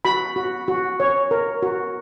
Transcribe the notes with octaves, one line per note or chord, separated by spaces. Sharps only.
F#4 B5
F#4
F#4
C#5
A#4
F#4